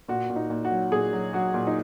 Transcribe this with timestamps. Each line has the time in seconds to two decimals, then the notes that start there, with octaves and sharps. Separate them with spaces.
0.08 A#2 F#4
0.30 A#2
0.36 D#4
0.50 A#2
0.65 F#4
0.71 F#3
0.92 A#2 G#4
1.13 F#3
1.33 F#3 F#4
1.54 A#2
1.67 D#4